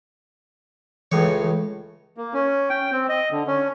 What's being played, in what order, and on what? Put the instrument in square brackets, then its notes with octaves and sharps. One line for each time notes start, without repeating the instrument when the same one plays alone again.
[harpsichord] C#2 A2 C#5 [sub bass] E3
[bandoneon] A#3
C#4
G5
C4
D#5
D3
C#4